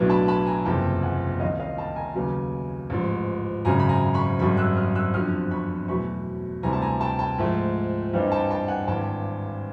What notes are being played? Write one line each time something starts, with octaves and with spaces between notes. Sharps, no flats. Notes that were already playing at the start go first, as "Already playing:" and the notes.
Already playing: B1 A2 F#3 B3 D4
A5 B5
A5 B5
G#5 A#5
F#1 E2 C3 F3 A#3 G5 A5
F#5 G#5
C2 C3 D#3 D#5 F5
D#5 F5
G5 A5
G#5 A#5
D#2 C#3 F#3 B3
A1 G#2 F3
G#1 F#2 C#3 G#5 A#5
B5
G#5 A#5
B5 C#6
G#1 F#2 D#3 G3 B5 C#6
E6 F#6
D#6 F6
E6 F#6
G1 F2 D3 F#3 D#6 F6
B5 C#6
E2 B2 F#3 A3 B5 C#6
D2 C3 E3 G3 G#5 A#5
A5
G#5 A#5
G5 A5
G5 A5
G#2 F3 A3
G2 E3 G3 C4 D#4
G5 A5
G5 A5
F#5 G#5
G#1 G2 E3 G5 A5